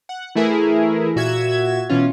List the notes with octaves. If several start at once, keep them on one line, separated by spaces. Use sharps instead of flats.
F#5
E3 A3 E4 G#4 A#4
A#2 F#4 E5 G#6 E7
B2 E3 C#4 F4